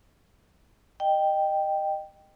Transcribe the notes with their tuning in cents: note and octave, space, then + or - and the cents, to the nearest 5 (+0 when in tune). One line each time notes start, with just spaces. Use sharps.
D#5 -20 G5 +0